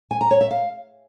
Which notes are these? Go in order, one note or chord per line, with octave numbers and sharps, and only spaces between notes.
G#5
A#5
C#5
E5
F5